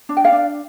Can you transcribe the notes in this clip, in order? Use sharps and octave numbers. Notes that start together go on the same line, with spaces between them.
D4
G5
D5 F5
D4